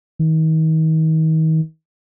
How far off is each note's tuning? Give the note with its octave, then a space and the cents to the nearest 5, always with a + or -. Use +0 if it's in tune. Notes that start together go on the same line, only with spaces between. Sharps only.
D#3 +35